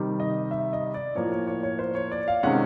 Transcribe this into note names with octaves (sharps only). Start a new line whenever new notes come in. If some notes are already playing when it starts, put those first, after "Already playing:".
Already playing: C3 D#3 G3
D#5
E5
D#5
D5
A2 F3 A#3 C#5
C#5
C#5
C#5
C5
C#5
D5
F5
C3 D#3 G#3 C#4 F#5